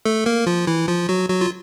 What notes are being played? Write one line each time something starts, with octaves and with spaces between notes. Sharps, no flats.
A3 A4
A#3 A#4
F3 F4
E3 E4
F3 F4
F#3 F#4
F#3 F#4
F4